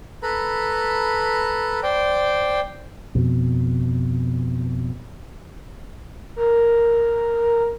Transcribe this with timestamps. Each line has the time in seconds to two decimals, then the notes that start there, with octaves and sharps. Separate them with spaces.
0.23 A4 B4 A#5 B5
1.83 C5 D5 G5
3.15 F2 B2
6.36 A#4